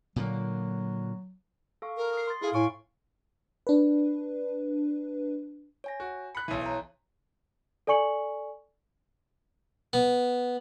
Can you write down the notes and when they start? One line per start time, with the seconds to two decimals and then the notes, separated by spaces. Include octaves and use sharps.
0.16 A#2 D3 F#3 A#3
1.82 A4 F5 C#6
1.97 A#4
2.13 D#6 C7
2.27 C6 A6
2.42 E4 G#4 A4 F5
2.54 A2 G#5 C#6 D7
3.67 D4 B4
5.84 C#5 G#5 A#6
6.00 F#4
6.35 B5 F#6 C#7
6.48 B1 E3
6.62 C#5 A#5
7.87 A4 D5 G#5 C#6 C#7 F#7
9.93 B3